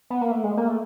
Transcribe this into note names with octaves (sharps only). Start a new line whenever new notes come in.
B3
A#3
A3
G#3
A#3
A3